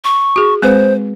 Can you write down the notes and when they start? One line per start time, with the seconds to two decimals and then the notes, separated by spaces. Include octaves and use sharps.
0.04 C#6
0.36 F#4 G#4
0.62 G#3 C4 B4 C5